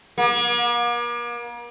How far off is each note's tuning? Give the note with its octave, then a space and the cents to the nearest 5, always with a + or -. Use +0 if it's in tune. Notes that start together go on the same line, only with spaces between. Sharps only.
A#3 +40